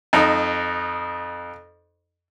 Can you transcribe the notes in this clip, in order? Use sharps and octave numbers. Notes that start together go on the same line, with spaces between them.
F2 D#4